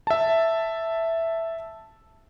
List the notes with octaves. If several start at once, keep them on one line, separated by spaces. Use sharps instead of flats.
E5 A5